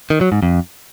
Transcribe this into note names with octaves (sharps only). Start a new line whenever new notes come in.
D#3
F#3
G#2
F2